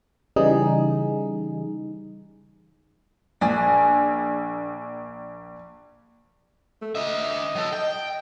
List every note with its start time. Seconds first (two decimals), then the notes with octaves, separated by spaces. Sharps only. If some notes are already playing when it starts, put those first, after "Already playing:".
0.36 C#3 E3 G3 D#4 G#4
3.41 A#1 D4 G#4
6.82 A3
6.95 D4 D#5 E5
7.55 F#3 A4
7.73 G5